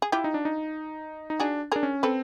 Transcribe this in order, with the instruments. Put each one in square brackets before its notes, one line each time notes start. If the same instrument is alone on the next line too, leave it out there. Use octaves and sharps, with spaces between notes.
[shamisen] G#4
[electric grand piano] E4 [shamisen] F4 G4
[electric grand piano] D#4
D4
D#4
D#4
[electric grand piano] D4 [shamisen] F#4 G#4
[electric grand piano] D4 [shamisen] G#4 A#4
[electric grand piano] C#4
[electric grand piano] C4 [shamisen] A4 B4